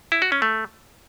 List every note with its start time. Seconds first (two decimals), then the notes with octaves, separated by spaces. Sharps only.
0.12 E4
0.22 F#4
0.32 C#4
0.42 A3